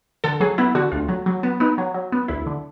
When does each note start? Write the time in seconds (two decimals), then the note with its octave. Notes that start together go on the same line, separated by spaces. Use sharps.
0.24 D3 A4
0.40 F#3 G#4
0.58 B3 E4
0.75 D3 F#4
0.92 D2 F4
1.09 F#3
1.26 F#3
1.43 B3
1.60 B3 D#4
1.78 F#3
1.94 F#3
2.12 B3
2.28 D2 E4
2.46 D3